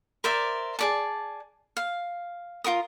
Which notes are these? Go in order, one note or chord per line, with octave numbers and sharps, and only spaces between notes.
A#4 C5 D5 E5
G#4 D5 A5
F5
F4 F#4 A#4 D#6